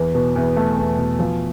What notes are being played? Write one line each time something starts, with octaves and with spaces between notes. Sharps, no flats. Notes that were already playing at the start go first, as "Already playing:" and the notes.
Already playing: E2
B2
E2
A3
E2
B2
F3